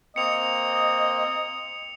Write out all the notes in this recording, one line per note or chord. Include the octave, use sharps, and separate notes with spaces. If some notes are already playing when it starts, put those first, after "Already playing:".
A#3 C4 D#5 C#7 F7